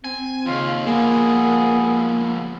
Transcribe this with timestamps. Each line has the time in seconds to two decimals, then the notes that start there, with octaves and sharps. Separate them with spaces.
0.04 C4 G#5
0.46 D#2 C#3 F4
0.87 F3 G#3 A#3 B3 G#4